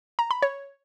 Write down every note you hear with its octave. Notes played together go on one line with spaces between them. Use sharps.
A#5
B5
C#5